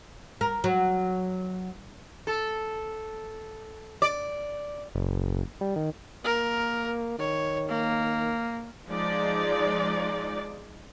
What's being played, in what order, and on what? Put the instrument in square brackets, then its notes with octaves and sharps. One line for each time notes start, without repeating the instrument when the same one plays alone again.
[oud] A#4
F#3
[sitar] A4
D5
[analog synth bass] F#1
G3
D#3
[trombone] A#3 [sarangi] A#4
[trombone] D#3 [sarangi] C#5
[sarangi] A#3
[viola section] F3 G#3 D#4 D5